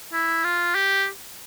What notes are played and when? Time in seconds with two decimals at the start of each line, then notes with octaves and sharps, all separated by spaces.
0.13 E4
0.44 F4
0.75 G4